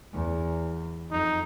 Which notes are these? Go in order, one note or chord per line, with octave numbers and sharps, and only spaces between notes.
E2
F2 D#4